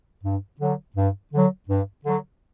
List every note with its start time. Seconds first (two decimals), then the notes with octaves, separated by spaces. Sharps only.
0.23 G2
0.60 D3 F#3
0.96 G2
1.32 D3 F#3
1.68 G2
2.04 D3 F#3